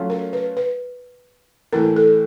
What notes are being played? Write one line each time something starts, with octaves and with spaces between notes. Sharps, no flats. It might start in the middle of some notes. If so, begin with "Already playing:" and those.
Already playing: F#3 A3 C#4 F4
A#4
B4
B4
A2 E3 A3 A#4
A4